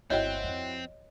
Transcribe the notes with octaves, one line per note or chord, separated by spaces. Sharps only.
G1 D#2 C4 E4 F#4 C#5 D#5 G5
F2